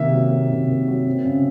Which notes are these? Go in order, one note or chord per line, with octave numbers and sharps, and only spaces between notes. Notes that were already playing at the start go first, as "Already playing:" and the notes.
Already playing: C3 D#3 A#3 E5
F#3
A#3
C3
D#3
F#3
C4
C#3